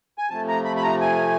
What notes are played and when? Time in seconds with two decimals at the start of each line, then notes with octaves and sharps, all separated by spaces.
0.18 G#5
0.29 C3 F3 A3 A5
0.48 A#5
0.65 B5
0.76 B5
0.83 A#5
1.01 G#5